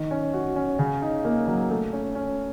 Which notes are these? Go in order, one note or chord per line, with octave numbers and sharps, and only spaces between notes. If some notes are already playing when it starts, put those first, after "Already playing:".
Already playing: D#3
C#4
F#4
C#4
C#3
D#4
A#3
F#3
A3
C#4
C#4